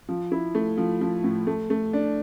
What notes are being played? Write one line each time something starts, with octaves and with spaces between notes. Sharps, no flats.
F3
E4
A3
F3
F3
A2
A3
A3
D4